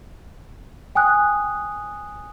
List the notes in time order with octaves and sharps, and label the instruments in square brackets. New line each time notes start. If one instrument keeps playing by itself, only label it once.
[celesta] G5 G#5 D#6 F#6